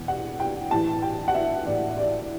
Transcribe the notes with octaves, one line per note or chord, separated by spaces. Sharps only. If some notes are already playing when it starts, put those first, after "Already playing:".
Already playing: E2 B2
F#5
G5
A2 E3 A5
G5
F#5
E5
A2 E3 D5
D5